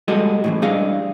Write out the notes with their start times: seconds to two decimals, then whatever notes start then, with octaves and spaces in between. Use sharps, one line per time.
0.08 G3 G#3 F#4 A4 D#5
0.44 A2 C#3 E3
0.62 G3 D4 G#4 D#5 F5